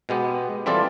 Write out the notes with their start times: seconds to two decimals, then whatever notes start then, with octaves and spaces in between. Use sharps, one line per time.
0.09 B2 G#3 B3 G4
0.66 E3 G3 C4 F4 A4 D5